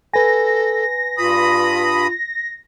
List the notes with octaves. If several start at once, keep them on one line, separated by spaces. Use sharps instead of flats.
A4 B4 G#5 A#6
G2 F4 B5 D#6